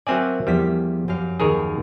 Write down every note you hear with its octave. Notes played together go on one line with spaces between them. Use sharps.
F#3 C4 A#4 D5 E5 G#5
E2 F3 G3 B6
F#2 G4 F5
D#2 G#4 A#4 C#5